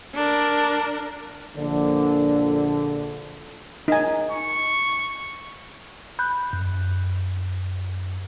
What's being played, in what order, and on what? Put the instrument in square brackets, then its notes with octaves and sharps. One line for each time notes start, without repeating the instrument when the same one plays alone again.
[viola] D4 A#4
[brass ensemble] A#1 D3
[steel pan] D#4 G#5
[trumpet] C#6
[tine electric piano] B5 F#6 G6
F#2